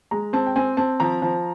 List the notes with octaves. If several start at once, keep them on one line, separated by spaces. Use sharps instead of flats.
G#3 A#5
C4 A5
G5
C4 G#5
C4 A5
F3 A#5
F3